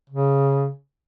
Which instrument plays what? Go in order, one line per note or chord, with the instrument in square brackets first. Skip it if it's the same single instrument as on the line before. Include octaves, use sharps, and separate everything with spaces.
[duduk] C#3